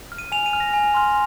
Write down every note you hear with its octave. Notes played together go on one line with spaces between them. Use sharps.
F6
D#7
G#5 F7
D#7
F6
A#6
G#5
C6 F6